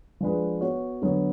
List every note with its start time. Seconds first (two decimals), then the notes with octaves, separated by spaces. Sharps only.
0.21 F3 G#3 D4 G#4 B4
0.61 B3 F#4 C#5
1.02 D3 F#3 B3